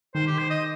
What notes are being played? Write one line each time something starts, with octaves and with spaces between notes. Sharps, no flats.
D#3 C5
G4
C5
D#5